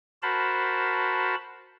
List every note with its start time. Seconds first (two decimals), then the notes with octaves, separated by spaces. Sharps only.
0.22 F#4 A#4 C5 A5 B5